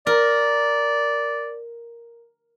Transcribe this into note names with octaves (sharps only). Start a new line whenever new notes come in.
A#4 D5